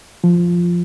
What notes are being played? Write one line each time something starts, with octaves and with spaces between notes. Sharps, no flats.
F3